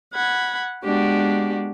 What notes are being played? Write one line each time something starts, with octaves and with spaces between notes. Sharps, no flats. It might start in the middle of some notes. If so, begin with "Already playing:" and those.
F#5 B5 G#6
G#3 B3 D4 F#4 G4